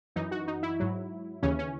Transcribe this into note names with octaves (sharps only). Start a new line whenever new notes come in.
F#2 E3 D#4
F#4
D#4
E4
G#2 F#3
D#2 C#3 E3 C#4
C#4